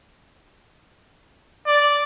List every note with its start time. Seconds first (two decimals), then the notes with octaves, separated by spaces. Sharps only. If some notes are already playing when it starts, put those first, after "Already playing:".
1.67 D5